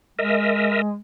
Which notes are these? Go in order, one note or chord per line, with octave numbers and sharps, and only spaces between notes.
G#3 A#4 D#5 E5